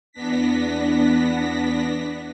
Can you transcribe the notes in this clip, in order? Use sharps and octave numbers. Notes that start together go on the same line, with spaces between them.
E2 B3 D4 A#6 B6